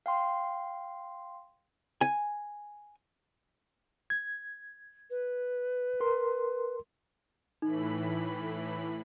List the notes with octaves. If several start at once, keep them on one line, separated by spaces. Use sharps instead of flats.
F5 G5 C6
G#5
G#6
B4
A#4 C6
A2 E3 D#4 B5